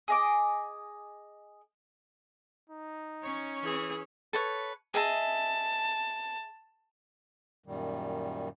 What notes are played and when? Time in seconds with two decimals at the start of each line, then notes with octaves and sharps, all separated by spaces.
0.08 G#4 D#5 D6
2.70 D#4
3.22 C#4 C#5
3.63 E3 G#4
4.33 A4 B4 C#5
4.94 G#4 D#5 E5 A5
7.66 F#2 A#2 D#3 G3